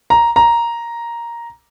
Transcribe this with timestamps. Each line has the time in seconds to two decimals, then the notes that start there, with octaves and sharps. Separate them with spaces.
0.10 A#5
0.36 A#5